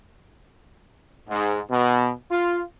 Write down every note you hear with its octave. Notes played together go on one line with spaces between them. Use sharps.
G#2
B2
F4